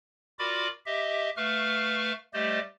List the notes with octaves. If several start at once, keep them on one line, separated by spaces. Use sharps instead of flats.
F4 F#4 A#4 D5 B5 D6
G4 D#5 E5
A3 B4 F5 C#6 F6
G3 A3 G4 C5 D5 D#5